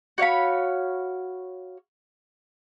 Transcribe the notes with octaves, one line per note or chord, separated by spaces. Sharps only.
F#4 C#5 F5 B5